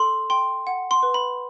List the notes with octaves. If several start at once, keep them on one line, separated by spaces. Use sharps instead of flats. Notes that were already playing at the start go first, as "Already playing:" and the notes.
Already playing: A4 C6
G5 C6
F#5
C6
B4
B5